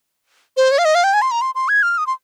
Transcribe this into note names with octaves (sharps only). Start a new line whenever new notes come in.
C5
C#5
F5
D#5
F5
G5
G#5
C6
A#5
C6
C6
G#6
F6
D#6
C6